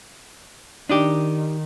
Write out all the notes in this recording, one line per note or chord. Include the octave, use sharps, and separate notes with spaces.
D#3 D4 D#4 G4